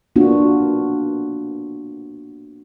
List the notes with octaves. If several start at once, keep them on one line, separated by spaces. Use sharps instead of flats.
A#3 B3 D4 F4 F#4